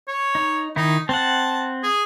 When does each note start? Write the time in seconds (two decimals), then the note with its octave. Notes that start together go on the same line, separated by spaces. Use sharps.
0.08 C#5
0.35 D#4
0.76 D#3 D#4 E4
1.09 C4 F#5 A5
1.83 G#4